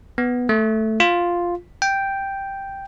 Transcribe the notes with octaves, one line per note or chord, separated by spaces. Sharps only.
B3
A3
F4
G5